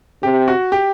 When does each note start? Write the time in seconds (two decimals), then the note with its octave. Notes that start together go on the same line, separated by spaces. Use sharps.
0.23 C3 G4
0.48 F#4
0.72 G4